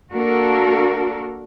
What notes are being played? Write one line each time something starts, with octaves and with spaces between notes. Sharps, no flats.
A#3 D4 F#4 A4 A#4